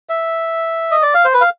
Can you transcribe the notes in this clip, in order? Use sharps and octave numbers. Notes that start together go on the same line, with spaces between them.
E5
D#5
D5
F5
C5
B4
F5